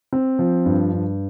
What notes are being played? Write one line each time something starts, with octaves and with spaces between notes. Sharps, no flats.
C4
F3
G2
G2